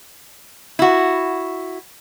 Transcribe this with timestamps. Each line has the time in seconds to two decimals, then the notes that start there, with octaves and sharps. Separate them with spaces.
0.79 E4 F#4